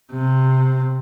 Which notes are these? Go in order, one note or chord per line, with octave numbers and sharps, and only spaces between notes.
C3